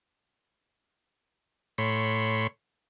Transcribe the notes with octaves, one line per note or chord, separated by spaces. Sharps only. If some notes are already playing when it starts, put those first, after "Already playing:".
A2 C#5 B5 C6